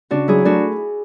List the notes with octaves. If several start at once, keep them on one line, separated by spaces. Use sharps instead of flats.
C#3 D4 F#4
F#3 E4 G#4
A3 D4 F#4